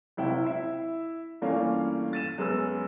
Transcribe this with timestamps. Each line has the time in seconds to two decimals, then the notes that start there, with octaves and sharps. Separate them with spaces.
0.17 F#1 C3 E4 F4 G5
0.44 E4 E5
1.42 G2 E3 A3 A#3 C#4 F4
2.13 A6 D#7 E7
2.38 F#2 G#3 B3 E6